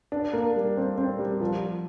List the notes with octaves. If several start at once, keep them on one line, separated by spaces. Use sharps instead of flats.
D4
A#3
G3
C4
C4
G3
F3